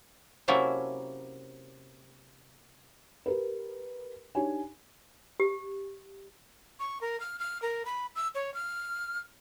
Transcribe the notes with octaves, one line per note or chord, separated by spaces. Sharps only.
C3 F#3 A#3 C#4 E4 A4
G4 A#4 B4
D4 D#4 G4 C#5 G#5
G4
C#6
A#4
F6
F6
A#4
B5
E6
C#5
F6